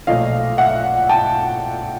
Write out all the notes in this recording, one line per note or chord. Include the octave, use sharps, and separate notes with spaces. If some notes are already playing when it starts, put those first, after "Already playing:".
B1 A#2 F3 A3 D#5 F5
E5 F#5
G5 A5